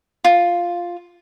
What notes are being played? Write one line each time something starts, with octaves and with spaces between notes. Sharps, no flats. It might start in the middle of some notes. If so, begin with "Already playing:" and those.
F4